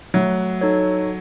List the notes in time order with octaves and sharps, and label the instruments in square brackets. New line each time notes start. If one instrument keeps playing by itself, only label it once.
[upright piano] F#3 [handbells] A3
[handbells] D#4 A4 C#5